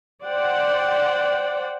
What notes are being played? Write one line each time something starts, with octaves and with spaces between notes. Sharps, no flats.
C5 D5 F#5 G5